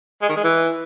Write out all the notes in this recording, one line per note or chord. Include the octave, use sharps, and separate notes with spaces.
G#3
D#3
G#3
E3